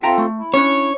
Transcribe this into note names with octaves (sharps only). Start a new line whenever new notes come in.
C4 F4 A4 E5 G5 A#5
A3
E4
C#4 D4 C#5